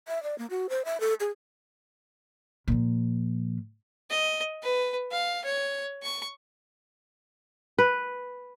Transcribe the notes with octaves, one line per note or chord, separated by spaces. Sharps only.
E5
D5
A#3
F#4
C5
E5
A4
G#4
A#2 F3
D#5
B4
F5
C#5
C#6
B4